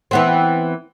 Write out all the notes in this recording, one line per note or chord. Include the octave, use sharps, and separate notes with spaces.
E3 B3 C4